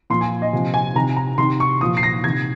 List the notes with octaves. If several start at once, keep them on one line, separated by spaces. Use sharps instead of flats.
A#2 F3 C6
G#5
D#5
C3 F3
G#5
C3 D#3 A#5
A#5
C3 D#3 C6
C#6
A#2 F3 D#6
C7
A#6
C3 D#3 G#6